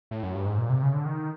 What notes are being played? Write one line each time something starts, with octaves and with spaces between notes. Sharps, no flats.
A2
F#2
G2
G#2
A#2
C3
C#3
D3
D#3